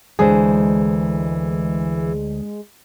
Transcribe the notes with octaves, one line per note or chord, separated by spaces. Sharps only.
D2 E3 G#3 G#4 C5